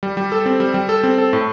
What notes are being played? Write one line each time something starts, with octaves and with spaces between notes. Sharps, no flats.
G3
G3
A4
C4
G3
G3
A4
C4
A4
A2